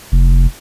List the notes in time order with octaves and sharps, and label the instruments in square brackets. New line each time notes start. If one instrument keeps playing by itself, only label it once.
[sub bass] F1